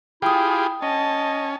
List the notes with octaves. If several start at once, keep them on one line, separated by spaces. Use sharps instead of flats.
E4 F4 G4 G#4 G5 D#6
C#4 D#5 A5